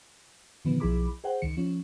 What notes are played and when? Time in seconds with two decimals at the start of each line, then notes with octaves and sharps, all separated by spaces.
0.65 A#2 D3 D#3 F3 B3
0.80 B1 F3 E4 G#4 B5 D6
1.24 G#4 C5 F#5 G5
1.42 C#2 D#3 C#7
1.57 F3 C#4